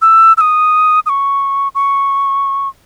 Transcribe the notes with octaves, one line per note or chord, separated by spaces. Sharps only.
E6
E6
D#6
D#6
C#6
C#6